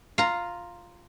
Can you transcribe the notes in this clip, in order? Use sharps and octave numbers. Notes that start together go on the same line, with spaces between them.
F4 A#5